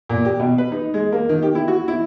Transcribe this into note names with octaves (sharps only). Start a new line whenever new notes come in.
A#2
G4
B2
B4
D#4
G#3
A#3
D#3
G4
E4
F#4
E4